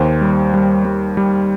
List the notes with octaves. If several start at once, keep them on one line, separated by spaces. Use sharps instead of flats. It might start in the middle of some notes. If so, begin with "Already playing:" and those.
Already playing: D#2 C5
G3
G3
G3
G3